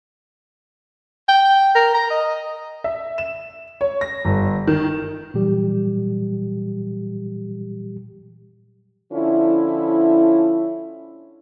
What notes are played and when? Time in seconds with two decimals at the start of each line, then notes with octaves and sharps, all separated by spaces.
1.28 G5
1.75 A#4
1.94 A#5
2.10 D#5
2.84 E5
3.18 E7
3.81 C#5
4.01 A#6
4.25 G1
4.67 D#3
5.34 A#2 E3 F#3 G3 G4
9.12 D3 F3 C#4 E4